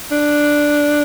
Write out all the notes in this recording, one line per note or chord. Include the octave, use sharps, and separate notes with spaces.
D4